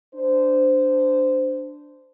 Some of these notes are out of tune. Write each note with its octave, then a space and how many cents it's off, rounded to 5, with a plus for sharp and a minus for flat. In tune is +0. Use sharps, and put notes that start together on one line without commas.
D4 +0 C5 -15